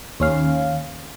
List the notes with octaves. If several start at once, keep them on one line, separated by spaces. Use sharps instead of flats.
D#2 C#4 F5